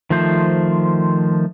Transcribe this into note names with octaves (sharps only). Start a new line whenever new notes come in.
D#3 F3 A3 C5